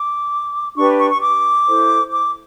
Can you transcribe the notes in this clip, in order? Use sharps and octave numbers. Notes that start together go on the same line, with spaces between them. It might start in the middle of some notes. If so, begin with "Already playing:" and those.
Already playing: D6
D4 G4 B4 C#6
C#6
C#6
D6
E4 A4 C5
D6